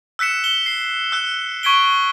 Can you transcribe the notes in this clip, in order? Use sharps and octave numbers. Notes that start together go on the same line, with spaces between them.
E6 F#6 B6 C#7 E7
G7
C7
E6 F#6
C#6 G#6 B6 D7 G7